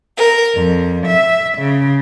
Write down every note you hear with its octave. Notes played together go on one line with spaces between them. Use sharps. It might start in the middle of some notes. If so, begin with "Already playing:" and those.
A#4
F2
E5
C#3